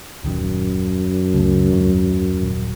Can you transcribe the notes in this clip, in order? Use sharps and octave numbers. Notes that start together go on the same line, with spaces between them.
D#1 F#2 D#3
C#2 C#3 A3
D#2 G#2 F#3
D#1